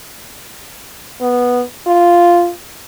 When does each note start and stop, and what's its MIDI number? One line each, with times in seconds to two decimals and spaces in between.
1.21 1.62 59
1.87 2.51 65